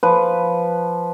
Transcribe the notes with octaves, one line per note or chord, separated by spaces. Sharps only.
F3 B4